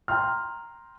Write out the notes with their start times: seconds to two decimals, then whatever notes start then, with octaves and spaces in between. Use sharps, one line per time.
0.08 G5 A#5 C6 F6